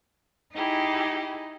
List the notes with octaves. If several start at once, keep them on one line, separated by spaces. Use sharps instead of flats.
D#4 E4 G4 G#4